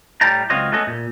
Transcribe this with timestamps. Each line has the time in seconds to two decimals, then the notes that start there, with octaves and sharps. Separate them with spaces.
0.21 A2 G3 G5 A5 A#5
0.50 C#2 F#3 C4 F4 C#5 D#5
0.72 A3 B3 C#4 G#4 A4 D#5
0.87 A#2